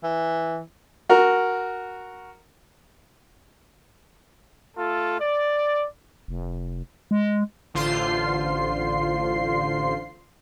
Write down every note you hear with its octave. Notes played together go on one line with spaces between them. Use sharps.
E3
F#4 A#4
A3 F4 A4
D5
F1
G#3
A1 D3 F4 C5 C6 C7